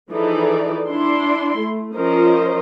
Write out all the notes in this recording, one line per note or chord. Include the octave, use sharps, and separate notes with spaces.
E3 F3 D#4 G#4 A4 D5
D4 E4 C6
A3
F3 C#4 F4 A#4 C5 D#5